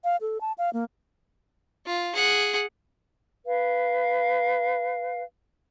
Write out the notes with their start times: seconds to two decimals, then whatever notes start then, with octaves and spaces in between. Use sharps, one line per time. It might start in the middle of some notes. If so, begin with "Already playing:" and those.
0.04 F5
0.21 A4
0.41 A5
0.58 F5
0.73 A#3
1.86 F4
2.15 G#4 F#5
3.46 B4 F5